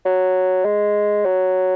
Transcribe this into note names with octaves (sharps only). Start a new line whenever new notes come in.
F#3
G#3
F#3